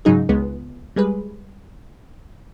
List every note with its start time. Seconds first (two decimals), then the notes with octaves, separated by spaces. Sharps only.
0.05 G#2 C#3 F#3 D#4 G#4
0.29 C#2 G#3 B3
0.96 G3 G#3 G#4 B4